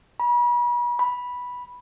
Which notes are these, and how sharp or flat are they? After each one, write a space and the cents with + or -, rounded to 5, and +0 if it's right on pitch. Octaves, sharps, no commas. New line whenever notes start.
B5 -40
B5 -5